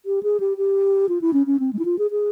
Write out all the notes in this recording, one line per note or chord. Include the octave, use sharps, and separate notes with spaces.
G4
G#4
G4
G4
F4
E4
C#4
C#4
C4
G#3
E4
F4
G#4
G#4